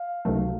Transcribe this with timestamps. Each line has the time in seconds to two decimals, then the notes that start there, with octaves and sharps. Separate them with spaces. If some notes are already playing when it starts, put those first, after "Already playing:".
Already playing: F5
0.25 C#2 C3 D#3 F#3 A3